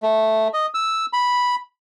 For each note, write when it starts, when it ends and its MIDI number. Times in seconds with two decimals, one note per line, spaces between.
0.03 0.48 57
0.54 0.66 75
0.74 1.06 88
1.13 1.55 83